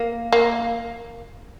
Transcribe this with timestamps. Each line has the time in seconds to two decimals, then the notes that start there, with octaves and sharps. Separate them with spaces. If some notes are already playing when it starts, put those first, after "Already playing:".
Already playing: A#3
0.32 A#3